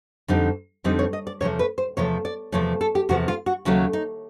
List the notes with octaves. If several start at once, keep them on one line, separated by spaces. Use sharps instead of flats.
F2 D3 G3 C4 D#4
F2 D3 G3 C4 D#4 D#5
C#5
D#5
D5
E2 C3 F3 A3 C#5
B4
C5
E2 C3 F3 A3 C#5
D5
E2 C3 F3 A3 C#5
A4
G4
E2 C3 F3 A3 F#4
F4
F#4
D#2 C#3 F#3 A3 C#4
D#4